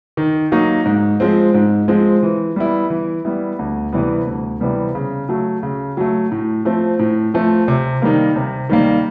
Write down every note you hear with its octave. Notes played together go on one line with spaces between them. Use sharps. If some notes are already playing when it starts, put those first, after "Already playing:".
D#3
F#3 A#3 D#4 F#4
G#2
F3 G#3 C4
G#2
F3 G#3 C4
E3
G3 B3 E4
E3
G3 B3 E4
D2
C3 E3 G3 B3
D2
C3 E3 G3 B3
C#3
F#3 A3
C#3
F#3 A3
A2
F3 A3 C4
A2
F3 A3 C4
C3
D#3 G3 A#3
C3
D#3 G3 A#3